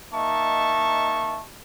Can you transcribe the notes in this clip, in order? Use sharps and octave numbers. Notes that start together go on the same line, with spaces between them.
A#3 D#4 D#5 E5 A5 C#6